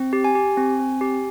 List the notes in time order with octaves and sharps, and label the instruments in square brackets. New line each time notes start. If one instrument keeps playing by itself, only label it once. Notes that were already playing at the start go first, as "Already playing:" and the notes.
Already playing: [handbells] C4
G4
G#5
G4
C4
C4
G4